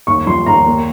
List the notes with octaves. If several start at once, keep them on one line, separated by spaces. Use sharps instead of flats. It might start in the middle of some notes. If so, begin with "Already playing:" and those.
D#2 C#6
F3 C6
D#2 A#5
A#3